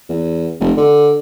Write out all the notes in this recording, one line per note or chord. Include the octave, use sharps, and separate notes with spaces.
E2
F1
D3